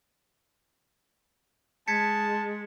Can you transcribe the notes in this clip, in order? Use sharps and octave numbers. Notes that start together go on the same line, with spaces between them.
G#3 A5 G#6 B6 C#7